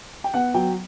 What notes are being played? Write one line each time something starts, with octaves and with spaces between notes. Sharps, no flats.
G5
B3 F#5
F#3 G5